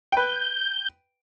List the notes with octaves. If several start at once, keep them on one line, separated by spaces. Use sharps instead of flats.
B4 G5 G6